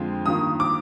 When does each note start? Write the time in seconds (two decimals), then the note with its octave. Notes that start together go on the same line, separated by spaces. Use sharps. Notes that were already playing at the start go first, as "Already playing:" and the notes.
Already playing: F2 D3 G#3 C4 F4
0.26 G2 D#3 A#3 F4 D#6
0.60 D6